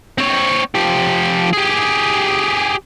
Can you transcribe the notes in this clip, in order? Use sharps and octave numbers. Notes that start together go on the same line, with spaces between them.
C4 C#5
F3 G4
G4 G#4